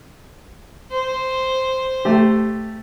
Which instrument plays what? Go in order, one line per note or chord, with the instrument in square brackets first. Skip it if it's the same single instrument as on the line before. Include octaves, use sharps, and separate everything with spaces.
[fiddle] C5
[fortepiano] A3 G4